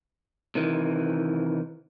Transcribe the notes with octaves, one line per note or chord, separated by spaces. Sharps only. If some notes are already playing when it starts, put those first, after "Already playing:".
C3 D#3 E3